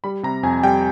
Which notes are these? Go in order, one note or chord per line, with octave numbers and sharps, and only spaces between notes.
G3 B5
C3 A#5
F2 G#5
G3 G5